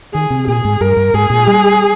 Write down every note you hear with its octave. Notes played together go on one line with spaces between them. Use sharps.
D#3 G#4
C3
A#2 G#4
G#2
G2 A#4
G2
G#2 G#4
A#2
G3